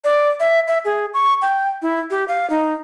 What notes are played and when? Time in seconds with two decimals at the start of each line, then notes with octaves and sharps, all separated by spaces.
0.04 D5
0.40 E5
0.68 E5
0.85 G#4
1.14 C#6
1.42 G5
1.82 E4
2.11 G4
2.28 F5
2.50 D#4